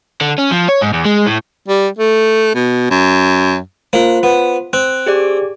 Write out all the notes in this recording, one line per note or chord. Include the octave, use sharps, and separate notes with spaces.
D3
C#4
F3
C#5
G#2
E2
G#3
A2
G3
A3
B2
F#2
A#3 F4 C5
B3
C4 F#6
G4 G#4 D5